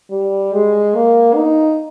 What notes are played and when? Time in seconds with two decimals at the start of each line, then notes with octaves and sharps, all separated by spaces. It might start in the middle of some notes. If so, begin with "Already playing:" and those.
0.11 G3
0.53 G#3
0.95 A#3
1.36 D#4